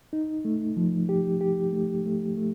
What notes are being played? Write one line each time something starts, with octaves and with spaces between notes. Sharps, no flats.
D#4
A3
F3
G4
G4
A3
A3
A3